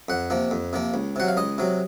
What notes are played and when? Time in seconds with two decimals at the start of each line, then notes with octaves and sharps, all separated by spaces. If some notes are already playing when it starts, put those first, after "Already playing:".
0.09 F2 F#5
0.30 C3 F3 A#3
0.51 F2
0.73 C3 F3 A#3
0.94 C#2
1.16 C3 F#3 F#5
1.28 F5
1.37 C#2 D#5
1.58 C3 F#3